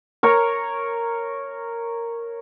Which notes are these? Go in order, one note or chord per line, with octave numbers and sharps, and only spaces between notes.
A#4 C#5 A#5